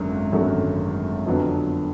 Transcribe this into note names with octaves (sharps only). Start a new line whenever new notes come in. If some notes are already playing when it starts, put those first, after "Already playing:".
Already playing: G#1 F#2 D3 F#3
G#1 F#2 D3 F#3 A3
F2 D3 F#3 B3 D4